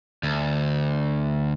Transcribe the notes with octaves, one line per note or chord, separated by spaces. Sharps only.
D2